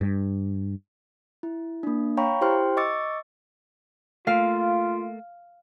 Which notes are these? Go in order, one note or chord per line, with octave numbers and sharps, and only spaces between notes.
G2
E4
A#3 D4
C#5 F5 G5 A#5 B5 C#6
E4 G4 C5 G5 C6 F6
D#5 C#6 D6 E6 A6 C#7
A3 A#3 F4 F5